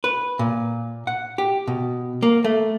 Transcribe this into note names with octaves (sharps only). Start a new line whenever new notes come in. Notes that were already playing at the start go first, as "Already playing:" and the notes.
B4
A#2
F#5
G4
B2
A#3
A3